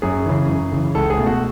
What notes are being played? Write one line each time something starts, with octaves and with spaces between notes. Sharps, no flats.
F#2 G#4
C#3 E3
F#2
C#3 E3
C#2 A4
G#4
B2 A3
F#4